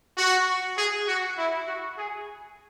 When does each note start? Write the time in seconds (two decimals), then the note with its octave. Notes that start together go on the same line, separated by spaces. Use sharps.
0.18 F#4
0.78 G#4
1.08 F#4
1.38 E4
1.67 F#4
1.98 G#4